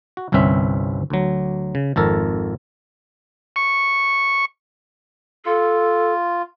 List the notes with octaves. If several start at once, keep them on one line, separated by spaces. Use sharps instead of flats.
F#4
G1 C2 G2 C4 C#4 E5
D2 F#3
C#3
G#1 F2 A4 A#4
C#6
F4 A4